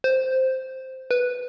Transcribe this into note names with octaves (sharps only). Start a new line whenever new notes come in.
C5
B4